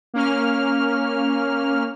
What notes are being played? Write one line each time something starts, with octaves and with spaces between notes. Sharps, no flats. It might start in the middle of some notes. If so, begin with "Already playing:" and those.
A#3 C#4 F6